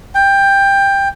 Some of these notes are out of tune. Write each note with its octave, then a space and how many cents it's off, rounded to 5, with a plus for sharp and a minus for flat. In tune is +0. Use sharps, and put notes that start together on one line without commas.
G5 +15